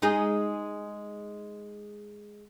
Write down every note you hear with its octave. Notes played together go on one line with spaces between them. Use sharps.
G#3 D#4 G#4